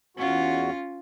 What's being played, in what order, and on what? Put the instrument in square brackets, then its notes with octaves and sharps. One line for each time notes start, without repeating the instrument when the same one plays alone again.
[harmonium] E2 F#4 [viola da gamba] C#4 F4